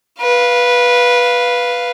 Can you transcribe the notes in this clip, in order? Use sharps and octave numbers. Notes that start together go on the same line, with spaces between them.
B4 F5